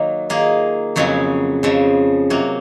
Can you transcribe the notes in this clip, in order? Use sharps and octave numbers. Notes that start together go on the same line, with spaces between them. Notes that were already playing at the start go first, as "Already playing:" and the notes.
Already playing: D#3 F#3 A#3
D#3 A#3 F4 G#4
F2 C#3 F#3 C#4 G#4
F2 C#3 F3
C3 F#3 A#3